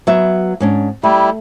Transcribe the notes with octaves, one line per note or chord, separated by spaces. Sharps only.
F#3 B3 E5
G#2 C#4 D4
G3 A3 E4